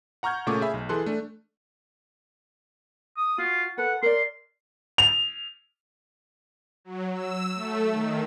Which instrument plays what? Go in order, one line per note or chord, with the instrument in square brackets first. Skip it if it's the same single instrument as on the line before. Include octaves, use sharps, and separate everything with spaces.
[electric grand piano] F#5 A#5 C#6 F6 G6 G#6
A#2 C#3 A3 C#6 D6
G#4 E5 B5
B1
E3 G#4 A4 C6 F#6
A3 D4
[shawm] D#6
[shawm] F4 [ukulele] F#4
[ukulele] A4 B4 [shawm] F#5
[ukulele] A#4 D5 [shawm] C6
[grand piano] F7
[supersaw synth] F#3
E6
A3
D#3